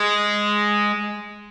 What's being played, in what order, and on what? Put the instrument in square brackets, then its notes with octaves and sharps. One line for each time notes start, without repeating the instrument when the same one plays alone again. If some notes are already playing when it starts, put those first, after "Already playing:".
Already playing: [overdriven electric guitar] G#3